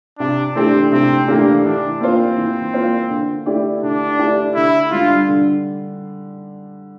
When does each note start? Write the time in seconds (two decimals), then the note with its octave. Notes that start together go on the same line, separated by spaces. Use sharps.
0.19 C3 D4
0.56 E3 A3 C4 D4 G4
0.92 C3 C4
1.28 E3 A3 A#3 D4 G4
1.64 E3 D4
2.01 A#3 C4 F4 C5
2.38 E3
2.74 A#3 F4 C5
3.10 D3
3.46 A3 E4 G4 D5
3.83 D3 D4
4.19 A3 E4 G4 D5
4.55 D3 E4
4.91 G3 D4 F4
5.28 D3